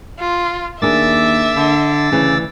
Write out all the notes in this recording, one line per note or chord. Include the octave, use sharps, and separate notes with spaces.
F4
D#2 A#3 D4 G#4 E5 D6 E6 A6
D3
D2 C#3 E3